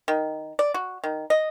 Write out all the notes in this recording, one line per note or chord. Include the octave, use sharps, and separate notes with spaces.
D#3
D5
F#4
D#3
D#5